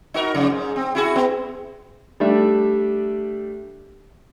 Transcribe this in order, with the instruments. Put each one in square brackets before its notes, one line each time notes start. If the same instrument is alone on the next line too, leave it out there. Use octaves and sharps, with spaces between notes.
[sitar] D#4 F#4 A#4
F2 C#3
G#2
C4
E4 F#4 G#4
B3
[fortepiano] G3 A3 D4 E5